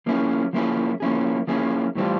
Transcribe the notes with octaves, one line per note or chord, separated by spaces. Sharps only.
F3 A#3 C#4 E4 G#4
F3 A#3 C#4 E4 G#4
F3 A#3 C#4 E4 G#4
F3 A#3 C#4 E4 G#4
A2 E3 G3 C4 F4